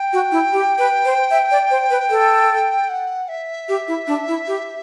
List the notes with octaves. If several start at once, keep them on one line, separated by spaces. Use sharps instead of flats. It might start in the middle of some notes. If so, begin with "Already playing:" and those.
Already playing: G5
F#4
E4
G4
B4
C5
E5
D5
C5
B4
A4
F#5
E5
G4
E4
D4
E4
G4